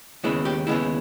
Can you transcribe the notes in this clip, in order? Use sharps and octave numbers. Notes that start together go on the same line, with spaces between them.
D#2 C#3 G#3 B3 E4
G4
D#2 C#3 G#3 B3 E4